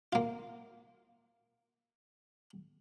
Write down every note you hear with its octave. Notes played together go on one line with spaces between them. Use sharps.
A#3 F4